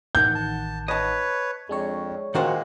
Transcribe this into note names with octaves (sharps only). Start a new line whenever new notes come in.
A1 D#3 F#5 G6
A5
B4 C#5 D#5 A5
F2 G#3 D4 C#5
A#2 D#3 G#3 A#3 F#4 A#4 C5